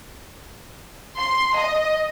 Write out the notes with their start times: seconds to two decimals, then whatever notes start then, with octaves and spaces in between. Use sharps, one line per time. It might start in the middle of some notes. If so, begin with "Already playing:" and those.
1.20 C6
1.57 D#5